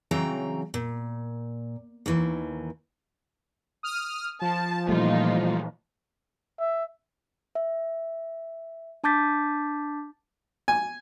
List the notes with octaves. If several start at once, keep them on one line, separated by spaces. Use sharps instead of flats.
C#3 E3 F#3 C4 G5 A#5
A#2
D#2 D#3 E3
D#6 F6
F3 A5
A#2 E3 G3 A3 D#4 F4
E5
E5
D4 A5 D6 G6 A6 B6
G#5